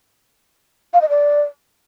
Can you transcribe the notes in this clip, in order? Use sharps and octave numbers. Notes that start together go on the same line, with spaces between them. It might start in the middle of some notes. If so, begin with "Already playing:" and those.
F5
D#5
D5